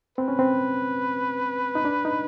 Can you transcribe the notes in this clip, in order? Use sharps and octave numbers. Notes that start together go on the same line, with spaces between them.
C4 B4
C#4
C4
D#4
D4
D#4